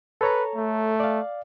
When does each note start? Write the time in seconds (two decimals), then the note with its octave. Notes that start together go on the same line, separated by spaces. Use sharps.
0.21 A4 B4 C#5 A#5
0.55 A3
1.00 D5 F5